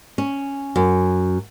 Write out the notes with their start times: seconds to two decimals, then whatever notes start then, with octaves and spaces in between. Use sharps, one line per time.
0.18 C#4
0.76 F#2